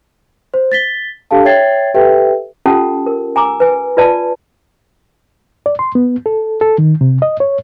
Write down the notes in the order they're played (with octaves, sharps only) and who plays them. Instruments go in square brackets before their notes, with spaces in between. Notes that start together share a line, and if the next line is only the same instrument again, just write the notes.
[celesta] C5
A6 B6 G7
D4 G4 A4 F5 A5
C#5 E5 G5 G#6 A6 C7
G4 A4 B4 E5 G5
[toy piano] C#4 F4 G4 A4 F#5 A5
A#4
G#5 A#5 D6 E6
B4 G#5
F4 B4 D5 A5
[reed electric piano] D5
C6
B3
A4
A4
D#3
C3
D#5
C#5